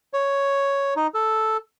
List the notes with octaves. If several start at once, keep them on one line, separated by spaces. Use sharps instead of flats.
C#5
D#4
A4